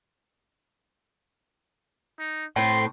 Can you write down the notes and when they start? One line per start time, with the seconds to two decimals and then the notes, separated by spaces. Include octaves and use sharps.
2.19 D#4
2.56 A2 C4 C6